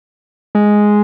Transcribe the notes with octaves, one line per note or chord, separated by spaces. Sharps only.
G#3